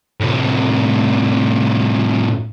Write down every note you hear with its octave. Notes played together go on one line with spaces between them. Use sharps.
A2 C3